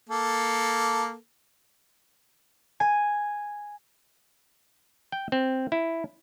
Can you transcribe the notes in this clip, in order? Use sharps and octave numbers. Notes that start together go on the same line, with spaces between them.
A#3 A4
G#5
G5
C4
E4